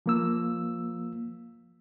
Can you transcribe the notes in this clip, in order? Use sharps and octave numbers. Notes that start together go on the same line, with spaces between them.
F3 A#3 E6